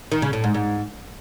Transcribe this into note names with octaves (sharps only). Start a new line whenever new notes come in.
D#3
C#3
A2
G#2
G#2